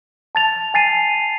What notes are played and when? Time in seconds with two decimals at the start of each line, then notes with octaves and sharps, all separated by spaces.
0.35 A5 A6 F7
0.74 G#5 A6 C7 D#7